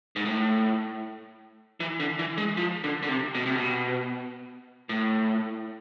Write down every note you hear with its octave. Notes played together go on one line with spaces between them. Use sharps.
G#2
A2
E3
D3
E3
G#3
F3
D3
D3
C3
B2
C3
B2
A2